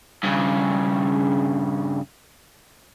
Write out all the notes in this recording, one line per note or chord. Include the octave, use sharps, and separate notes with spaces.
G2 C#3